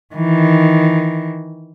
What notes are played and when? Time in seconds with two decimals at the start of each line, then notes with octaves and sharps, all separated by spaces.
0.15 D#3 E3